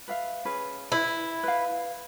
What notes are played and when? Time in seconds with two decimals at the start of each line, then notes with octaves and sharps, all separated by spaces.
0.08 B4 E5 F5
0.45 C#4 G#4 B4
0.92 E4 B4 B5
1.43 B4 F5